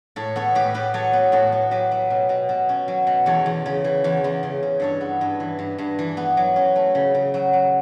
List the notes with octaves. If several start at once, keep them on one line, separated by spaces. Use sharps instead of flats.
A2 A4 C#5
B3 A4 C#5
A2 G4 B4
B3 G4 B4
F#3 A4 C#5
B3
A2 F#4 A4
B3
F#3 G4 B4
F#3
B2
B2
B2
C#4
F#3
B2
E2 A4 C#5
E2
C#3
E3
E2
E2
C#3
C#3
G2 A4 C#5
B3
G2
E3
G2
G2
E3
B3
F#3
C#4
A3
C#3
C#3
F#3
F#3